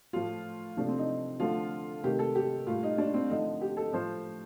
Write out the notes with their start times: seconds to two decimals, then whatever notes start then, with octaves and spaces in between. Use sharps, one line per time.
0.13 A2 F3 A3 F4
0.77 C3 F3 A3 D4
0.88 C4
0.98 D#4
1.40 D3 F3 A3 F4
2.03 C3 D#3 A3 G4
2.19 A4
2.35 G4
2.67 A2 G3 F4
2.83 D#4
2.98 D4
3.14 C4
3.30 D3 F3 A3 D#4
3.61 G4
3.77 A4
3.92 A2 F3 A3 C5